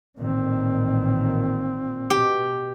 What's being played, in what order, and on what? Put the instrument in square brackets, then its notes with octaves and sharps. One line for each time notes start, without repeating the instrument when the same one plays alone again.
[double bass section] A1 A#2 D#3 [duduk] C4
[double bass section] B2 [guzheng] G4